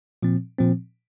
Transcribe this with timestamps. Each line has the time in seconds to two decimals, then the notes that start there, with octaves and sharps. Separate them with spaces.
0.23 A#2 F3 C4
0.58 A#2 F3 C4